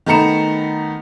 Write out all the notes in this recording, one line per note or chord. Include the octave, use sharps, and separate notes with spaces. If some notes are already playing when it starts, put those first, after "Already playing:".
D#3 A3 B3 A#5 C#7 E7